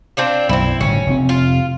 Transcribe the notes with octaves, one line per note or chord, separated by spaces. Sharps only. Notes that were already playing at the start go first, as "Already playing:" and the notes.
C4 D4 F4
B1 F#2 C4 E4
G1 A2 C#3 C#4
F1 G#2 C4
F4